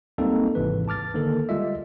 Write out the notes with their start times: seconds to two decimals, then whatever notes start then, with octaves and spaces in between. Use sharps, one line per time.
0.18 G3 G#3 A#3 C4 D#4 A4
0.55 G#1 G#2 C3 E3 B4
0.88 A5 D6 F6 A6
1.14 D3 D#3 A#3 A4 A#4
1.49 G3 G#3 F4 D#5 E5